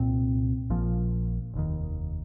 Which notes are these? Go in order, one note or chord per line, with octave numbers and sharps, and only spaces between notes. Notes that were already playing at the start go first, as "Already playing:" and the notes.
Already playing: C2 A#2 C4
A#1 A#2 F3
F1 D#2 D#3